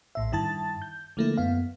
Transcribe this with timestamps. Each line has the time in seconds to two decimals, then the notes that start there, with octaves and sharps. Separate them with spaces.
0.15 A1 A2 E5
0.32 G2 D#3 E4 A5 A6
0.82 G6
1.17 D3 F3 A3 A#3 E4
1.37 F#2 B3 F5